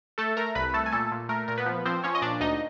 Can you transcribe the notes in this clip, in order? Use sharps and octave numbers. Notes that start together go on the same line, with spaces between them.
A3 A4 A5
A3 A#4 A#5
C2 B4 B5
A3 A4 A5
G#5
A#2 A4 A5
A#2
A3 A#4
A#2 A#4
B3 B4
F3
F3 C4 C5
F3 C#4 C#5
D#5
A#2 D4 D5
D2 D#4 D#5